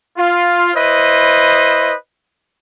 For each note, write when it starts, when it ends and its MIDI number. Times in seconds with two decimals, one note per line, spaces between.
0.17 0.70 65
0.75 1.94 64
0.75 1.94 71
0.75 1.94 72
0.75 1.94 75